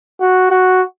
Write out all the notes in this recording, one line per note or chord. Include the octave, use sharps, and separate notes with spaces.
F#4
F#4